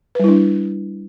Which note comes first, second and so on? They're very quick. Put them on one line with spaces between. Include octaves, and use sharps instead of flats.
B4 G3 E4 D4